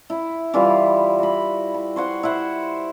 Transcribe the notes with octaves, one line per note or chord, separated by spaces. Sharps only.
E4
E3 G3 E4 F4
F#4 B5
B5
C5 C#5 F#5 C6
E4 C5 F#5